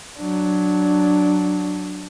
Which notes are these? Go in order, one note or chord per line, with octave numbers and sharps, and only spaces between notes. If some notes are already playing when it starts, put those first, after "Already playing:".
F#3 D4